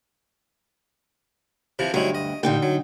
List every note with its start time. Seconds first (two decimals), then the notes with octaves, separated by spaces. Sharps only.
1.79 C3 E3 F3
1.94 D2 G2 F#3 D#4 E4
2.15 D#5
2.43 A1 A#2 D3 D#4 G5
2.63 F#3